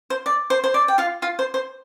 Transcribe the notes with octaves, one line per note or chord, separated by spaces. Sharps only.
C5
D5
C5
C5
D5
G5
F4 F5
F4 F5
C5
C5